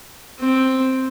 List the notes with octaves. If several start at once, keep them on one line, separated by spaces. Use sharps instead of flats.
C4